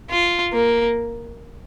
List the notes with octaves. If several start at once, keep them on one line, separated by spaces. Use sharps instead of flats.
F4
A#3